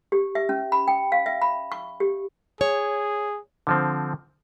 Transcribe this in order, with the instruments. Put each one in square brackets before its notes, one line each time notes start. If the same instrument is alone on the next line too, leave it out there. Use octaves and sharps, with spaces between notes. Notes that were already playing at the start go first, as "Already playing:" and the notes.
[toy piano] G4
E5
C#4
B5
G5
F5
E5
B5
C#6
G4
[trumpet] G#4 [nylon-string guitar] C#5
[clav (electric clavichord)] D3 F3 C4